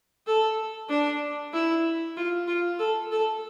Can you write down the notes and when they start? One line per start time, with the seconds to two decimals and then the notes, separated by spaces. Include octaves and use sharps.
0.27 A4
0.89 D4
1.53 E4
2.17 F4
2.47 F4
2.79 A4
3.11 A4